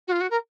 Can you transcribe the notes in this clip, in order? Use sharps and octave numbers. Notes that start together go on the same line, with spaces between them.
F#4
F4
F#4
A#4